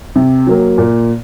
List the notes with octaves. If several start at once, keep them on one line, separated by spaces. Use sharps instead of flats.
C3
F#3 A#3
A#2